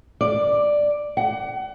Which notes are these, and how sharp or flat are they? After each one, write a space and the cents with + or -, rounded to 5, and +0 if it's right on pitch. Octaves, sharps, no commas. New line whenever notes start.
D5 +5
F#5 +30